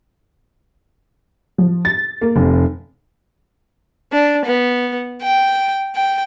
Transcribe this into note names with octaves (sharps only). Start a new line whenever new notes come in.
F3
A6
A#3
F1
D4
B3
G5
G5